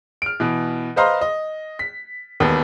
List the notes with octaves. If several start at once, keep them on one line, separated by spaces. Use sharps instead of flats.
F6 D7
B2 E3
B4 C5 D#5 F5 A#5 C6
D#5
B6
E1 D#2 B3